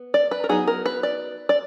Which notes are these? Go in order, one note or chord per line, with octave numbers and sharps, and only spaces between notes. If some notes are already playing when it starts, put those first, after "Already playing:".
Already playing: B3
D5
B4
A#4
F#3 B3 D#4 G#4
A#4
B4
D5
D5